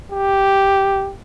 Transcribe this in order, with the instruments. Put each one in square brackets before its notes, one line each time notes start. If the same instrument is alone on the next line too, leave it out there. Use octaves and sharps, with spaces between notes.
[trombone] G4